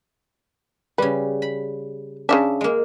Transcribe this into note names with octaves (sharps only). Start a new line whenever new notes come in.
C#3 G3 B4
B5
C#3 E3 D4 E5
G#3 A#3